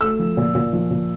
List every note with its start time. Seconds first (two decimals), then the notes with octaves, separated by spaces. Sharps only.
0.01 A3 E6
0.19 F3
0.37 A#2
0.55 A#2
0.73 F3
0.91 A#2